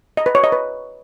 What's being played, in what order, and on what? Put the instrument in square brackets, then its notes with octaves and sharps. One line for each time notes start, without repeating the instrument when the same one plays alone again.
[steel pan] D#5
B4
C#5
D#5
B4